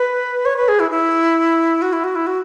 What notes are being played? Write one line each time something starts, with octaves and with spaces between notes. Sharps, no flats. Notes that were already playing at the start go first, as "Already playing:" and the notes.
Already playing: B4
C#5
B4
G#4
E4
E4
F#4
E4
F#4
E4
F#4